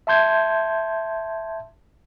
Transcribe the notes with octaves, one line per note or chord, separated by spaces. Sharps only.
E5 A5 C6 G6 G#6